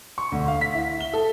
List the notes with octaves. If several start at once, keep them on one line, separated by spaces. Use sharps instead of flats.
C#6
D2
F5
B6
E4
G7
A4